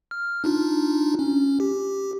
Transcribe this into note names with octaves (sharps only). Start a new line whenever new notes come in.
F6
D4 D#4 F4
C#4
G4